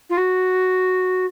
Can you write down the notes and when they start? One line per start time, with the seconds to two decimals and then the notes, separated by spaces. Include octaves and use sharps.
0.10 F4
0.17 F#4